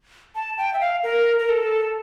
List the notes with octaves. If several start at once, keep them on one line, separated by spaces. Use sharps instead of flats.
A5
G5
E5
F5
A#4
A#4
A4